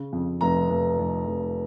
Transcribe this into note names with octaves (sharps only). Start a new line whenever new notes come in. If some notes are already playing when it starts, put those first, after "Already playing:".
Already playing: C#3
F2
F1 A#5
F1
F1
F1